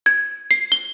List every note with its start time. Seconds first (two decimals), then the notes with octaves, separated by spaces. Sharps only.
0.06 G#6
0.51 C7
0.72 G7